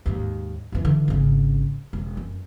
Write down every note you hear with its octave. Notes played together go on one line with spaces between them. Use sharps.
D#2 G#2
F2 E3
D3 E3
G#1 C#3
E1
F#2